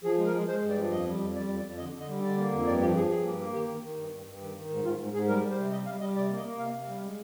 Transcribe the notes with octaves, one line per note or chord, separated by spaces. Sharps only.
F3 G#4
G#3
A#4
G#3
G#3 C5
G2
D5
F3
F2 D#5
G3
F2
G3 D5
F2
D5
F2
D3 D#5
D3
D#5
G3
D3 D5
A#3
F2
G2 D5
F3 G4
F3 G#4
G2 G#4
A#3
A#3
D#3 G4
D#3
D#3
G2
G2
G2
D#3
D#3
G#2
G#2 F4
G#2
G#2 G#4
G3 A#4
G3
C5
C3
G3 D#5
G3 F5
G3 D#5
C3 D5
A#3
D#5
A#3
C3 F5
C3
G3
G#3